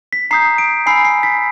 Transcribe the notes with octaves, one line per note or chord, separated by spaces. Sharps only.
B6
A#5 D#6 G6 C7
D7
G#5 B5 E6 C7
C7
B6